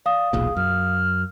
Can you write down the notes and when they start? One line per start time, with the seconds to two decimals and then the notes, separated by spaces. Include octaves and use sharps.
0.06 D5 F5 D#6
0.33 E1 B1 A#2 G#4
0.57 F#2 F6